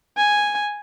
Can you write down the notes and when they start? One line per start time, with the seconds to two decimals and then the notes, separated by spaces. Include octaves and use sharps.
0.17 G#5